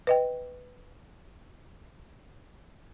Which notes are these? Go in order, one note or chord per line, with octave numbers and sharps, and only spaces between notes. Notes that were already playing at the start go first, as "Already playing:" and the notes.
B4 D#5 G5